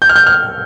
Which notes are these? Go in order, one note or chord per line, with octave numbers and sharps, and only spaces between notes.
G6
F6
G6
F6